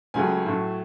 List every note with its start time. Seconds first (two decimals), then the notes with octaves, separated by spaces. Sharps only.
0.14 C#2 C#3 F#3 A3 G#5
0.46 A2 F#3 A3